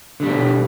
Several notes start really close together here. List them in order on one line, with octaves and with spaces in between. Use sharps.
D3 G3 B2